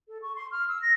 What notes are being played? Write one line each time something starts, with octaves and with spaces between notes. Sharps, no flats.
A4
C#6
C6
F6
E6
A#6